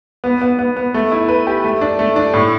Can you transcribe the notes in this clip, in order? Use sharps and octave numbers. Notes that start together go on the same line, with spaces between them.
B3
B3
B3
B3
A3
E4
B4
G4
A3
D4
A3
D4
A2